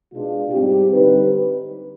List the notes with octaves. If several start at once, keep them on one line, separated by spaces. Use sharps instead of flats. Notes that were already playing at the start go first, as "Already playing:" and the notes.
B2 G#3 D4 F4
G#2 G3 C4 D#4 G4
D3 G3 C4 D#4 B4